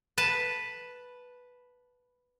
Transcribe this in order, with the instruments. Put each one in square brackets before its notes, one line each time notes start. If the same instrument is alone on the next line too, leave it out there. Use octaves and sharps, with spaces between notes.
[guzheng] B4 A5